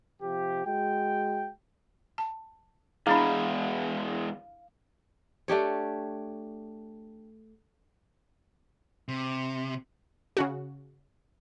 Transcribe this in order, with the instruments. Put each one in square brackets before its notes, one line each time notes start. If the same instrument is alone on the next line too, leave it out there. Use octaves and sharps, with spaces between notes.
[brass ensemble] C3 F3 G4
G#3 F#4 G5
[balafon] A5
[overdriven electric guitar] E2 G#3 [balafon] D4 G#4 [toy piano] E4 B5 [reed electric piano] F5
[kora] A3 D4 G4 C#5
[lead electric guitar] C3
[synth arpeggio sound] C#3 C#4 F#4